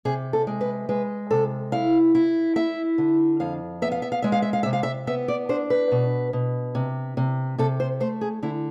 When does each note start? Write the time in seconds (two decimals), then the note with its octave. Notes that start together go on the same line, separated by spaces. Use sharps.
0.05 C3 G#4
0.33 A4
0.47 G#3
0.61 B4
0.89 G#3 B4
1.31 C3 A4
1.72 E4 F5
2.15 E4
2.56 E4 E5
2.98 D3
3.40 F2 F5
3.82 B3 E5
3.92 F5
4.02 E5
4.12 F5
4.22 G#3 E5
4.32 F5
4.42 E5
4.53 F5
4.63 C3 E5
4.73 F5
4.83 E5
5.07 B3 E5
5.28 D5
5.49 D4 C5
5.70 B4
5.91 B2
6.33 B2
6.75 C3
7.17 C3
7.58 C3 A4
7.80 C5
8.00 A3 C5
8.21 G#4
8.43 D3 E4